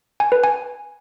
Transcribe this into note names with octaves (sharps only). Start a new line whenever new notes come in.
G#5
B4
G#5